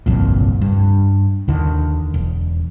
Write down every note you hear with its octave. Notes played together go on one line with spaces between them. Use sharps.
G1 C2 F2 A#2
G2
D#2 D3 D#3
E1